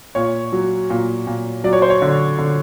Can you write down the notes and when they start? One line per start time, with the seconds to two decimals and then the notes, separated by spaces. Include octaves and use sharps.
0.15 A#2 C#5
0.52 F#3
0.90 A#2
1.27 A#2
1.64 F#3 D5
1.73 C#5
1.82 C5
1.90 C#5
2.02 D3
2.39 D3